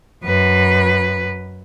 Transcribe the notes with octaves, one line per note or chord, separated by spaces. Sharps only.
F#2 B4